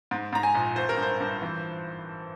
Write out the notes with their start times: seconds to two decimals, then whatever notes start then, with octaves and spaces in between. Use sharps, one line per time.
0.11 G#2
0.33 G#2 A#5
0.43 G#5
0.55 A#1
0.75 G#1 C5
0.89 A#4
0.97 G2
1.02 C5
1.20 G2
1.42 E3